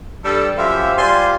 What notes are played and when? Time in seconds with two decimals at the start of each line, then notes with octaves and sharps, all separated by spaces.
0.25 G2 G3 A4
0.58 F#2 F3 G4 C5 E5 F5
0.98 G3 F4 G4 C5 G#5 C6